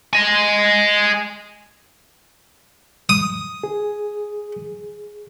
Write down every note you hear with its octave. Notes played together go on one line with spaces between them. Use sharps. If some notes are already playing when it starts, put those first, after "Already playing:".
D#5 G#5
D#6
G#4